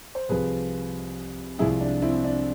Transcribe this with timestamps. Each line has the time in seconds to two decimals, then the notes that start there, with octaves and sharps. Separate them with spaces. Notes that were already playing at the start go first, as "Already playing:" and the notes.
0.15 C5
0.29 C2 C3 F3 G#4 B4
1.59 C2 C3 F3 G#3 E4 G#4
1.81 D4
2.02 C4 E4
2.24 D4